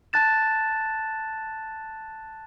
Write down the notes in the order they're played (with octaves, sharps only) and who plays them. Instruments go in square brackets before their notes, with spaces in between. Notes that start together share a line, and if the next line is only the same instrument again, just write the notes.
[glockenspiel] A5 F#6 A6 E7